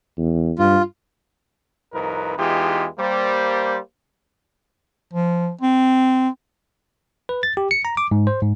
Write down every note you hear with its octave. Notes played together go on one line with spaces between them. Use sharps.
E2
G2 F4
C2 F2 D#4 A#4 B4
E2 E3 G#3 D#4 F4 G4
G3 A#3 C5
F3
C4
B4
A6
G4
C#7
A#5
D6
G#2
C5
G#2